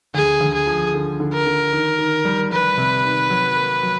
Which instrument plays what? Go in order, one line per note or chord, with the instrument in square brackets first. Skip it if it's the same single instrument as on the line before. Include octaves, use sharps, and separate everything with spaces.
[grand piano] D2 [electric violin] G#4
[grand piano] D2
[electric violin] G#4
[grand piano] F3
D3
D3
[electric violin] A#4
[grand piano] D3
D#3
D#3
G3
[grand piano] G3 [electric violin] B4
[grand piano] C3
D#3
F#3
A#3
F#3